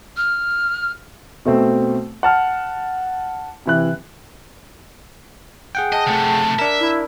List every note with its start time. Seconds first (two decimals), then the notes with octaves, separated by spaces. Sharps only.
0.16 F6
1.45 B2 A3 C4
2.23 F#5 A5 F6
3.66 C3 E3 F#6
5.75 G#4 F#5 G5
5.92 D#5 A5
6.06 C3 A3
6.59 D4 A#4 E5
6.80 E4